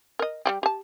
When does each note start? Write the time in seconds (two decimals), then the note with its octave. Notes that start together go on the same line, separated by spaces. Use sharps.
0.19 A#4 D#5
0.46 G3 G#3 G4
0.63 G4 A5